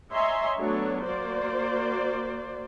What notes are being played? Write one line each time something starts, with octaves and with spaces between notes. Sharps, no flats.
C#5 D#5 E5 G#5 A#5 C6
F#3 A3 B3 D4 A4 C#5
A#3 F#4 C5 D5